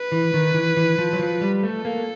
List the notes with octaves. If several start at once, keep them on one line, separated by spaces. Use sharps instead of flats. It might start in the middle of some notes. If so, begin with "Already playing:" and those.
Already playing: B4
E3
D#3
E3
E3
F3
F#3
F3
G3
A3 A4
A#3